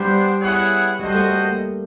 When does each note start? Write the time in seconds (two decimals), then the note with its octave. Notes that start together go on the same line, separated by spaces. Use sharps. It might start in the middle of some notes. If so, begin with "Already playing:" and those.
Already playing: G3 B3 D4 G4 C5
0.41 B3 E4 G#4 C#5 F#5
0.99 G3 F#4 A4 C5 D#5
1.14 A3
1.29 A3
1.44 A#3